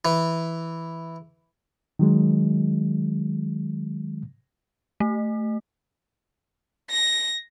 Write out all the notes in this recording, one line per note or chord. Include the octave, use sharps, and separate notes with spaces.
E3
D#3 F#3 G#3
A3
A#6